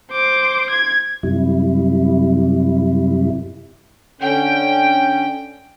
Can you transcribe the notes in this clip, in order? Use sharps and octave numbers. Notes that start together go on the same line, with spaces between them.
C5 D6
G#6
F#2 C3 G3 E4
D3 C#4 G5